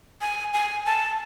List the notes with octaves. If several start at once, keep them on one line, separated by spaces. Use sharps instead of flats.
G#5
G#5
A5